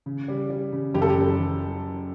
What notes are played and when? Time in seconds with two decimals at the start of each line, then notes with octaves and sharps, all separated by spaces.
0.06 C#3
0.28 G3
0.50 G3
0.73 C#3
0.94 F#1 G4
1.02 A4
1.10 G4
1.17 F#2
1.39 F#1